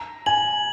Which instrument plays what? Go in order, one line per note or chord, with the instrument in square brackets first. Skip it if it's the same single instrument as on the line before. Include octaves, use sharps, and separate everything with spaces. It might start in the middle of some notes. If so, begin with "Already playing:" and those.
Already playing: [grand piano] A#5
[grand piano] G#5 [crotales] F#7